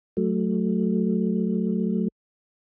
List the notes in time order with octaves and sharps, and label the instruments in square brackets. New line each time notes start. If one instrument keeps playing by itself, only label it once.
[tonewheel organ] F#3 A3